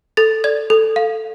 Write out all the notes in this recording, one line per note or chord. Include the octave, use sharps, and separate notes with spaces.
A4 A6
D5 G#6
A4
F5